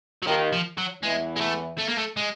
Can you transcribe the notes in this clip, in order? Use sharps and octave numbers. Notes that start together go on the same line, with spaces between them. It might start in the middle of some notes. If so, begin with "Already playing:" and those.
F#3
D#2 D#3 F3
F3
F#3
E2 E3 G#3
G#3
A3
A3
A#3
A3
G#3